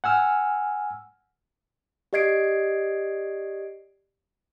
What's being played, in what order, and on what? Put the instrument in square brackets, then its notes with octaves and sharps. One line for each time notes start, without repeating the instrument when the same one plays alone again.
[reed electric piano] F#5 G#5 E6 F6
[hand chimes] G4 D5 D#5 G#6 C7 D7